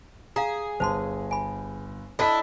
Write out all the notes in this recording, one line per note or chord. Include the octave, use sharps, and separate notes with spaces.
G#4 F5 A#5
G1 C5 A5 C6
G#5 B5
D4 E4 A4 D#5 A5 B5 B6